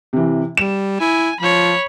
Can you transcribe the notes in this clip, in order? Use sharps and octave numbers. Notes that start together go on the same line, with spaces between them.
C3 E3
G3 E7
E4 G#5
F3 C#5 B5